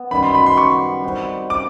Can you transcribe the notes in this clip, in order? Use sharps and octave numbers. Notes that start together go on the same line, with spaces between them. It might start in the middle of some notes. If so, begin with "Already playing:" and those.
Already playing: B3
F#2 D#3 G3 B5
C6
B5
C6
C#6
G3 C4 D#4 F#4
D6